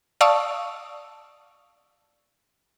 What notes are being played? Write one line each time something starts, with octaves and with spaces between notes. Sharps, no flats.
D5 F5 A5 C#6 D#6 E6